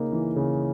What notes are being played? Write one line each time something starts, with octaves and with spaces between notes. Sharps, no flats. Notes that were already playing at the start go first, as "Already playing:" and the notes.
Already playing: C#3 A#3 D#4
E3
C#3